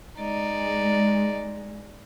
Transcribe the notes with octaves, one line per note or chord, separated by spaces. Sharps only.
G#3 D#4 D5